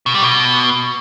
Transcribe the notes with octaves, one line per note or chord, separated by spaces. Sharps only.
B2
G3
B2